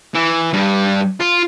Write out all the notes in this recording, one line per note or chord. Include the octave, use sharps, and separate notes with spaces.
E3
G2 G3
F4